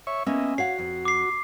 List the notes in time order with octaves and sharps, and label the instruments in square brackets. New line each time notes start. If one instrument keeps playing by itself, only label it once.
[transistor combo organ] C#5 E5 C#6
[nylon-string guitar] A#3 C#4 [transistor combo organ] B3 D#5 E5
[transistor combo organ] F#4 [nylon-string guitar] C#5 F5 F#5 [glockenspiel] C7
[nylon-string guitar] F2
[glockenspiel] D6 C7